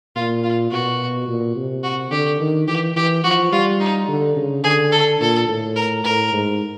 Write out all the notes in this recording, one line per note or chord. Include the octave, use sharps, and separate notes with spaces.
A#2 F4
F4
B2 F#4
A#2
C3
F#4
D3 G4
D#3
E3 G4
E3 G4
F3 F#4
G3 F4
D#4
D3
C#3
D3 G#4
A4
A#2 A4
A2
A#4
A2 A#4
G#2